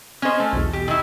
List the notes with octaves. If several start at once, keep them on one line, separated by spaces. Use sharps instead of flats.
C#4 C5 D#5 F6
A3
B1 E2
G4
D#3 E4